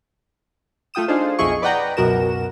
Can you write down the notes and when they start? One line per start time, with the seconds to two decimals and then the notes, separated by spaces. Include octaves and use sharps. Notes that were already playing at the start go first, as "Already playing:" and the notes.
0.94 A3 F4 G5 D#6 E7
1.08 D4 D#4 F4 G#4 A4 C5
1.39 B1 F2 E4 G#4 D#5 C#6
1.62 B4 D5 D#5 F#5 G5 A#5
1.97 C#2 F#2 B2 F#4 A#4 E7